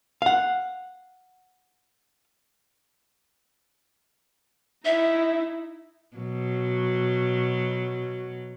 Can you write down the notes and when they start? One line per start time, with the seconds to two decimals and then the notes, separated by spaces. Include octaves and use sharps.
0.22 F5 F#5
4.85 D#4 E4 E5
6.17 B2 F#3